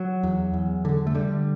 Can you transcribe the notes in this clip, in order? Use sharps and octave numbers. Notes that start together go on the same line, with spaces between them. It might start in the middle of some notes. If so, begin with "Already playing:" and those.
Already playing: F#3
E2
E2
D3
A3
D3 G3